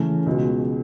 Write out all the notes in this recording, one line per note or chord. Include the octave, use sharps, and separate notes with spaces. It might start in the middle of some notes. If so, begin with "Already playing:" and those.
Already playing: C#3 E3 A3 C#4
C#2 B2 G#3